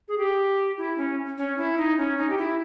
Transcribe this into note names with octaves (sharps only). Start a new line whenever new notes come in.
G#4
G4
E4
C#4
C#4
E4
D#4
C#4
D#4
G4
E4